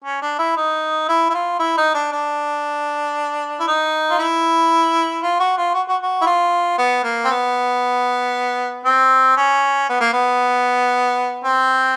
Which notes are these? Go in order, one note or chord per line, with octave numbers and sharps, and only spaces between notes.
C#4
D4
E4
D#4
E4
E4
F4
E4
D#4
D4
D4
E4
D#4
F4
E4
F4
F#4
F4
F#4
F#4
F#4
E4
F4
B3
A#3
C4
B3
C4
C#4
B3
A#3
B3
C4